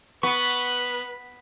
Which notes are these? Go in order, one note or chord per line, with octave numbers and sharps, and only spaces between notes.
B3 B4 C#6